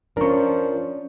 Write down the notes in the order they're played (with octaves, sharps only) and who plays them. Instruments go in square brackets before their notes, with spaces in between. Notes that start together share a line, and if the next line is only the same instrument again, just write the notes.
[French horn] F3 [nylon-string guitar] C#4 D4 [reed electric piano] A#4 C#6